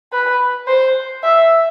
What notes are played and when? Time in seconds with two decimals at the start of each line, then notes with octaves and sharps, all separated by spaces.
0.12 B4
0.68 C5
1.24 E5